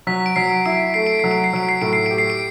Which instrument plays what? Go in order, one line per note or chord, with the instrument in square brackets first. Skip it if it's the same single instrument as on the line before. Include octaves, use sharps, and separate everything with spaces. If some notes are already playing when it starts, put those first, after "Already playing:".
[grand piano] F#3 [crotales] B6
[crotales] D7
[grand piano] F#3 [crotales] C7
[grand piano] E4 [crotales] D7
[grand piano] A3 [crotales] C7
[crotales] D7
[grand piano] F#3 [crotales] C7
[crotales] D7
C7
[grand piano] F#3 [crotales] D7
[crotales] C7
[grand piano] A2 [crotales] D7
[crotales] C7
[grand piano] G4 [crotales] D7
[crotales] C7
D7